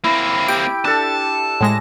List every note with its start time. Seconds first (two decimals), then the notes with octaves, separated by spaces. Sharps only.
0.04 A#3 C4 E4
0.48 G4 D7
0.85 D4 A4 A5
1.61 A2 G#3 A#6